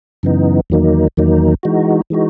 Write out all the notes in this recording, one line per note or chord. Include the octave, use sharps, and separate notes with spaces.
F#2 C#3 E3 B3 D#4
E2 D#3 F#3 A#3 D#4
E2 D#3 F#3 A#3 D#4
E3 G#3 D#4 F#4
E3 G#3 D#4 F#4